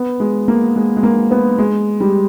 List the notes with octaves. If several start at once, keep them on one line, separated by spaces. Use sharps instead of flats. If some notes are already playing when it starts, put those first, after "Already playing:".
Already playing: B3
G#3
A#3
G#3
G#3
A#3
B3
G#3
G3